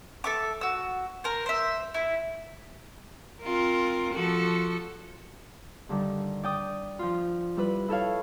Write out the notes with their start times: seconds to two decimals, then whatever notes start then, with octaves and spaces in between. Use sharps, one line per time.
0.24 A4 E5 D6
0.61 F#4 E6
1.24 A#4 C5
1.46 C5 E5
1.94 E4
3.42 C4 F4 A#4
4.14 F3 F#4 A4
5.89 G2 D3 D#3 G3
6.43 D5 G5 D#6
6.99 F3 F4
7.57 G3 E4 B4
7.88 E4 A4 C#5 F5